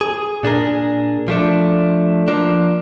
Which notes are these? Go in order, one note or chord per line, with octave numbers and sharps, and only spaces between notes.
G#4
A#2 D4 G#4 A#4
F3 A3 D4
F3 A#3 D4